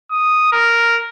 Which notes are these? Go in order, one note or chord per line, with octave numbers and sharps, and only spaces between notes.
D#6
A#4